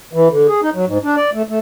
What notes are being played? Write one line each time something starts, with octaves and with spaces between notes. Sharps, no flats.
E3
D3
G#4
D#4
F#3
G#2
D4
D5
A3
A3